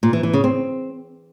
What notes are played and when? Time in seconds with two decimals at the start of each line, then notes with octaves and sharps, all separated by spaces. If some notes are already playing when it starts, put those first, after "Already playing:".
0.03 A#2
0.13 E3
0.23 E3
0.33 C#3
0.44 C4